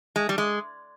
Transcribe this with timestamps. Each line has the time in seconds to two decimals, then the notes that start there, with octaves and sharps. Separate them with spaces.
0.16 G#3
0.29 G3
0.38 G#3